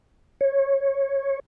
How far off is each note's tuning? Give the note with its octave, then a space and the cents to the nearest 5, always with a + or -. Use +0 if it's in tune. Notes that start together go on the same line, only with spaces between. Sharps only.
C#5 -15